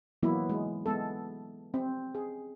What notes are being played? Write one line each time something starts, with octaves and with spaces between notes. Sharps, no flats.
E3 F#3 A#3 B3 E4
G#3
G#3 B3 A4
C4
G#4